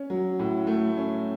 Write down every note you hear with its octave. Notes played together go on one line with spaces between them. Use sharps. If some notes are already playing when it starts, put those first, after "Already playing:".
Already playing: C#4
F#3
A2
A3
C#4